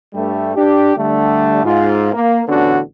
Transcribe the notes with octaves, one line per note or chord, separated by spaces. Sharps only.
G2 G3 A3
D4 G4
D3 G3 A3
G#2 F4
A#3
A1 D3 B3 C#4 D4 F#4